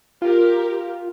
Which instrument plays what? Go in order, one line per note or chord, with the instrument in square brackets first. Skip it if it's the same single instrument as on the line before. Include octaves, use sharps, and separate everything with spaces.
[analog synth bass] F4 [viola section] G4 A#4